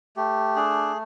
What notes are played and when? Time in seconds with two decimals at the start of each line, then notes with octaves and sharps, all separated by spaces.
0.17 A3 G4
0.56 D4 G#4